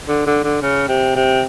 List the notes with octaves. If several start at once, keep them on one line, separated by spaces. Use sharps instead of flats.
D3
D3
D3
C#3
C3
C3